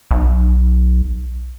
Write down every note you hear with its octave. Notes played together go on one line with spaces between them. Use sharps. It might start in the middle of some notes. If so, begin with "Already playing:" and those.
B1